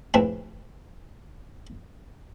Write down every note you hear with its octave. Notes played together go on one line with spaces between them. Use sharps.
A#1 A2 C4 B4 A5